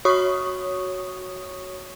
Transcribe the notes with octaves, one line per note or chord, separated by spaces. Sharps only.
F#4 C#5 C#6 D#6